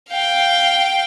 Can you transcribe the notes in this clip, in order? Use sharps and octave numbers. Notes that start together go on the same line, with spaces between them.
F5 G5